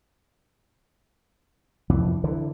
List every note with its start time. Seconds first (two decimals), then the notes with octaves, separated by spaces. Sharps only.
1.89 C2 F2 E3
2.24 D3 E3